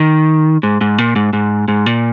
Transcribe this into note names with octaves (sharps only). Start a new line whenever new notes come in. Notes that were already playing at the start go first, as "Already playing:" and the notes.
Already playing: D#3
G#2
G#2
A#2
G#2
G#2
G#2
A#2